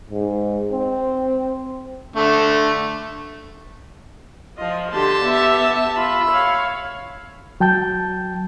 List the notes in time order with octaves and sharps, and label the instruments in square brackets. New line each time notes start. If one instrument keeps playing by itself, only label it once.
[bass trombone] G#2
C4
[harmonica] D3 A3
[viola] F3 F4 [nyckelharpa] D#5
[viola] D3 C6 [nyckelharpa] G4 A5
[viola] B3 E5
[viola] F4 [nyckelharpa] E5 B5
[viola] C#5 F5
[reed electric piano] F#3 G5 A5 G6